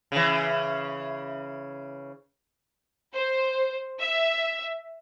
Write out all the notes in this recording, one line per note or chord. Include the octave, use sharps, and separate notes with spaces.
C#3 E3
C5
E5